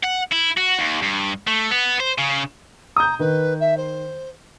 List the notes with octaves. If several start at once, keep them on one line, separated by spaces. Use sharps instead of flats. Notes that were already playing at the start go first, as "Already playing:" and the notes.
F#5
E4
F#4
D#2
G2
A3
B3
C5
C#3
A#5 D#6 G6
D#3 B4
E5
C5